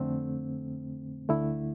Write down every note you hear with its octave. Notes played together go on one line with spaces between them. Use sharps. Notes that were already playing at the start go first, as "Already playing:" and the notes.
Already playing: F2 D3 A3 C4
D2 D3 A3 E4